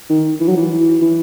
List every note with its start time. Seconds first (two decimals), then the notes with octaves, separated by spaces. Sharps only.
0.10 D#3
0.40 E3
0.48 F#3
0.57 E3
1.02 E3